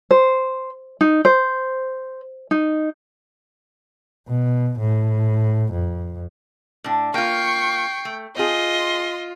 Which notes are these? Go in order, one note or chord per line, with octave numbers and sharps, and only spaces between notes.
C5
D#4
C5
D#4
B2
A2
F2
A2 D4
A#3 F4 G5 C#6 C7
A3
C4 F4 G#4 D#5 C6